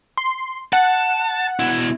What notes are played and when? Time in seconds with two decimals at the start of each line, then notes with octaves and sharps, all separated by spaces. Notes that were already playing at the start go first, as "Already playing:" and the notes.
0.17 C6
0.73 F#5 A5
1.59 B2 E4